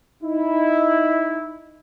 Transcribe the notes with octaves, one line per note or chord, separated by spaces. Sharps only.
D#4 E4